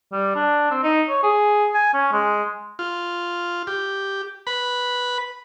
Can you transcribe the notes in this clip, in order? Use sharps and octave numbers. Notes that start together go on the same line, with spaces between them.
G3
D4
C4
D#4
C#5
G#4
G#5
C#4
G#3
F4
G4
B4 B5